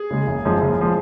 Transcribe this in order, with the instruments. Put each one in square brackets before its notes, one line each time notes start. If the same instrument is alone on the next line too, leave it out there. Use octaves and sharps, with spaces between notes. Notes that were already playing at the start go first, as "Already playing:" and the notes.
Already playing: [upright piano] G#4
[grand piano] C#3 G#3
F#1
F#2 F3 G#3
F#1
F3 G#3